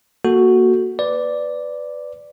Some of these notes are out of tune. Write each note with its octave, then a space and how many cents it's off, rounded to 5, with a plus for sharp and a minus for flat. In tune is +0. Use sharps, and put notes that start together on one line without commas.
A#3 +0 F#4 +0 A4 +0
B4 +20 D5 +0